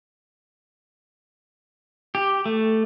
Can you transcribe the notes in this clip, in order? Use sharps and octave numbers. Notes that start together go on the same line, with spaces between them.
G4
A3